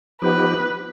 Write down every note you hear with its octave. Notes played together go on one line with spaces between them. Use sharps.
F3 B3 D#4 G4 B4